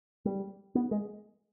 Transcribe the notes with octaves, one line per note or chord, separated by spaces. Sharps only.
G3
B3
G#3